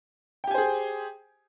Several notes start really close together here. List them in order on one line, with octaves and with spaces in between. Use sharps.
G5 G4 G#5 C5 G#4